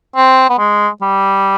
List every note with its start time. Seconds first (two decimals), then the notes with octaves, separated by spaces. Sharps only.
0.16 C4
0.50 B3
0.58 G#3
1.02 G3